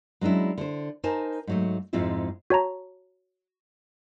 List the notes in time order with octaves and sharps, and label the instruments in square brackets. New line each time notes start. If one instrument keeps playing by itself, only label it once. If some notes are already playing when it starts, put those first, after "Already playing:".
[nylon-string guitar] F#3 G#3 C#4 D4 E4
D3 C5
D#4 A#4 C5 G#5 A5
G#2 F#3 A3
F2 G#2 G#3 C4 E4 F4
[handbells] F#4 C#5 A5 A#5